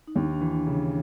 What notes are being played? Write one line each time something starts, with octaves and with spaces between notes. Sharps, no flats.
D#4
D#2 D4
D4
E3
D4
C#3